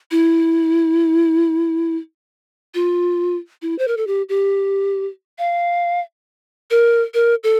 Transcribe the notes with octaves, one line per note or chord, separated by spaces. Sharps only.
E4
F4
E4
C5
A#4
A4
G4
G4
F5
A#4
A#4
A4